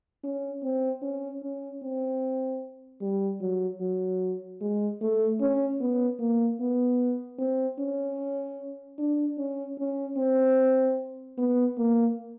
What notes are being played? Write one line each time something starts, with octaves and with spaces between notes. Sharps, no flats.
C#4
C4
C#4
C#4
C4
G3
F#3
F#3
G#3
A3
C#4
B3
A#3
B3
C4
C#4
D4
C#4
C#4
C4
B3
A#3